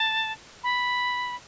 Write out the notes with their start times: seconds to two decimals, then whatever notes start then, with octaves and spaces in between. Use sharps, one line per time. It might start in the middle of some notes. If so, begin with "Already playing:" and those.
Already playing: A5
0.64 B5